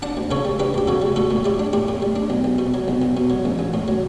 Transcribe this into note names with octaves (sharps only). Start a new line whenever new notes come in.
D4 F#5 A5
D2
C#3 A4 C#5
G3
D4 G4 B4
D2 G4
C#3 F#4 A4
G3
A2 F#4 A4
A2
G3 E4 G4
D4
A2 E4 G4
A2
G3
D4
B1
B1
B2
F#3
B1
B1
B2
F#3
A1
A1
A2
F#3